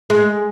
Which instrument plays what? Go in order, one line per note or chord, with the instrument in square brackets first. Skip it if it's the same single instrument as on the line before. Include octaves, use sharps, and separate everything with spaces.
[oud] G#3